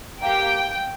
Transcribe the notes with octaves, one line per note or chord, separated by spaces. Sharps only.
A#3 G4 G5